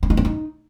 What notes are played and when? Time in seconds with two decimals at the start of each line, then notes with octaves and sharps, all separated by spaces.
0.03 C#4
0.10 D#4
0.17 C4
0.25 D#4